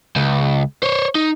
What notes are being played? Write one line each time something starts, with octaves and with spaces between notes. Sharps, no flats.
C#2
C5 C#5
D#4